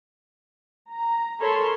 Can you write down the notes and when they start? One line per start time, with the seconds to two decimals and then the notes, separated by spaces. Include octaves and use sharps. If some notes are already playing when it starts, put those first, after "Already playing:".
0.89 A#5
1.40 A4 A#4 C#5 B5 C6